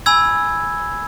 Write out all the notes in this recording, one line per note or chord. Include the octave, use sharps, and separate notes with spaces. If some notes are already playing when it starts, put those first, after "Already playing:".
G#5 B5 E6 G#6